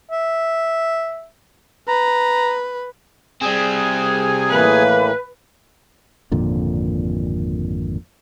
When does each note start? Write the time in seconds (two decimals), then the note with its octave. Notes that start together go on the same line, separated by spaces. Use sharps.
0.11 E5
1.88 B4 A#5
3.42 G3 C4 G#4 G#5
4.50 A2 E3 A#3 B4
6.32 G#1 F2 A#2 D3